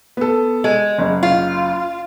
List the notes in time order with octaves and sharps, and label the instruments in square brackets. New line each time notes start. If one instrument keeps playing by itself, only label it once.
[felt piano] B3 A4
[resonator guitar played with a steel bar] G#3
[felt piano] F#1
[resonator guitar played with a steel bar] F4